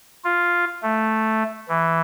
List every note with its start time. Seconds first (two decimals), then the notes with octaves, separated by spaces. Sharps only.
0.24 F4
0.82 A3
1.69 E3